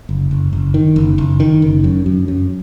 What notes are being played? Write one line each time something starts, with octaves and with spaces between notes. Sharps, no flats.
F#1
F#1
F#1
D#3
F#1
F#1
D#3
F#1
F#2
F#2
F#2